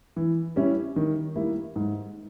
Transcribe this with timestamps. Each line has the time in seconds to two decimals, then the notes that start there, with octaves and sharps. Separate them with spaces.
0.16 E3
0.56 G3 C#4 E4
0.96 D#3
1.36 G3 A#3 E4
1.76 G#2